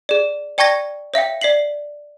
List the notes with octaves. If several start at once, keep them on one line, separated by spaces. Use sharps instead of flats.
G#4 D5
D5 G5 A5 C#6 G#6 A#6
C#5 E5 F5 G5
D5 B6 C7 F#7